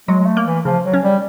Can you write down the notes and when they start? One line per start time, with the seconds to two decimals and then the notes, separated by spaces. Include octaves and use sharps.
0.08 F#3 G#3
0.19 G#3
0.26 A3
0.37 A#3
0.46 E3
0.65 C#3 F3
0.85 F#3
0.93 C#4
1.03 G3